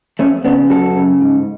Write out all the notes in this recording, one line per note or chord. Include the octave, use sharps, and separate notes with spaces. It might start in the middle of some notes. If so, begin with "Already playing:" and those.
F2 A3 C#4
C#3 B3 D4
F#2 F#4 A4
C#3
G#2